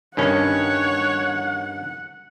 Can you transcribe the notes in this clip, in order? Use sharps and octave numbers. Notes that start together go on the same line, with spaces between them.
G2 D#3 C#4 C#5 F#5